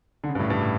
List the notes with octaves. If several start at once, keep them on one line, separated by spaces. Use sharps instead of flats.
D3
C#3
G2
A2
G2
A2